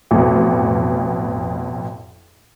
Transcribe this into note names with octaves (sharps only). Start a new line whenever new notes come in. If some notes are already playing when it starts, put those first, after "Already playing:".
A1 F2 B2